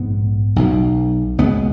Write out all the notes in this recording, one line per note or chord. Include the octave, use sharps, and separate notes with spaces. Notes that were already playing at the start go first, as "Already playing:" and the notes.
Already playing: A#1 G#2 B3
B1 B2
C#2 B2 B3